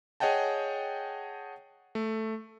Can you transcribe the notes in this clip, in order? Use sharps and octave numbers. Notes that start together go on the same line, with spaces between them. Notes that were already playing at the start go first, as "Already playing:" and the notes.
G#4 C#5 D#5 F#5 G5 A5
A3